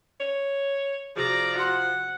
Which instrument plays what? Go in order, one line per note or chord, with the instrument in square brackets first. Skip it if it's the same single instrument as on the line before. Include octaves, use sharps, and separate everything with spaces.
[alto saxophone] C#5
[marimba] C3 F#4 G#4 [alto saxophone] F3 [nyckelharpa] D5 A#5
[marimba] F#4 C6 [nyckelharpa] F#5